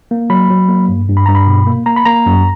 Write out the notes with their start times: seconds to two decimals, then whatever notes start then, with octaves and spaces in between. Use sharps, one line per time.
0.11 A#3
0.30 F#3 B5
0.50 F#3
0.69 A#3
0.89 G2
1.09 G2
1.17 B5
1.26 G2 A#5
1.35 B5
1.47 B2
1.67 A#3
1.86 A#3 A#5
1.96 B5
2.06 A#3 A#5
2.26 F#2